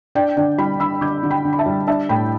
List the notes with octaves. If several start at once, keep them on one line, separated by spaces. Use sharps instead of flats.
D4 D5 G5
D3 D5 G5
G3 G5 B5
D3 B5 E6
D3 D6 G6
D3
G5 B5
D3
B5
E5 A5
G3
D4 E5 A5
A2 G5 B5